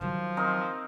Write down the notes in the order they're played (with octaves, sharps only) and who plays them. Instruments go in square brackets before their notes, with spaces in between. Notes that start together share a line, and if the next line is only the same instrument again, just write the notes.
[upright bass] D#3 F#3 [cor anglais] F3
[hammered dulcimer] C4 D#4 A#4